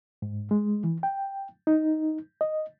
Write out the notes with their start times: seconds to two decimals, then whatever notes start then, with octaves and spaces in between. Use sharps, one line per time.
0.22 G#2
0.51 G#3
0.84 E3
1.03 G5
1.67 D#4
2.41 D#5